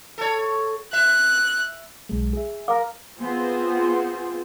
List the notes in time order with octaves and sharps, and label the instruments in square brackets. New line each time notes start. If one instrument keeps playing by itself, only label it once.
[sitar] A4 C#5
[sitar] E5 [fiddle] F#6
[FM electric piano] B1 G#3
G#4 E5
[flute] A#4 [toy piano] F5 D6
[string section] B3 C4 F4 G#4 C5